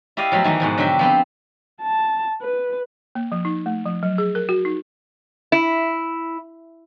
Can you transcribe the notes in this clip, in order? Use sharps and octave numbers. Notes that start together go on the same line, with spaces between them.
E4 G4 D5 D#5 F5
F3 F#3 A3 B3
D#3 E3 A#3 D#4
G#2 B2 F3
D3 F#3 G4 E5 G5
F3 B3 C4
A5
B4
A#3
F3
D#4
A3
F3
F#3
G#4
A#4
F#4
D#4
E4